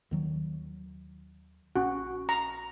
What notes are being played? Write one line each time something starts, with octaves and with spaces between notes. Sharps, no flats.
D#2 D#3 F#3
A#1 C#4 F#4
A#5